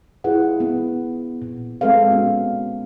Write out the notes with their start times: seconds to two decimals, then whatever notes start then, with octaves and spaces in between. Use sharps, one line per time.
0.24 E4 F4 G#4 B4 F#5
0.60 B3
1.42 A#2
1.81 G#3 C4 A4 B4 F5
2.10 B3 C#4 F#4